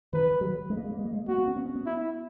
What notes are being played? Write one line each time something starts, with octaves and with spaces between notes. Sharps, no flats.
D#3 B4
F#3
G#3
A#3
G#3
A#3
G#3
A#3
G#3
A#3 F#4
B3
C#4
B3
C#4
B3
E4